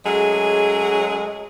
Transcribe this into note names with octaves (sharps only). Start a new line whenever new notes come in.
F#3 G#3 A3 C#4 G#4